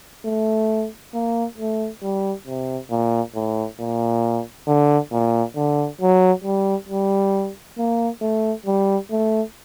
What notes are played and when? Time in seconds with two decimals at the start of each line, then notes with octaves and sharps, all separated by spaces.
0.25 A3
1.14 A#3
1.58 A3
2.02 G3
2.47 C3
2.90 A#2
3.35 A2
3.79 A#2
4.67 D3
5.12 A#2
5.56 D3
6.01 F#3
6.44 G3
6.89 G3
7.78 A#3
8.21 A3
8.66 G3
9.11 A3